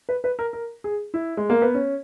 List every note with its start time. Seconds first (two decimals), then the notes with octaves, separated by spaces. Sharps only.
0.09 B4
0.24 B4
0.39 A#4
0.53 A#4
0.84 G#4
1.14 E4
1.37 G#3
1.50 A#3
1.62 B3
1.74 C#4